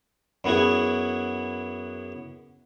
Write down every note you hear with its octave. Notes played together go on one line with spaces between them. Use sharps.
F#2 B3 E4 F#4 G#4